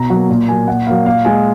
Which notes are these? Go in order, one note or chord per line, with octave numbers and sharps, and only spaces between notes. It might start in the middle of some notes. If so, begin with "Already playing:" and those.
Already playing: B2 A#5
F#3 A#3
A#2
F#3 A#3 G#5
A#2 F#5
F#3 A#3 F5
A#2 F5
G#3 G#5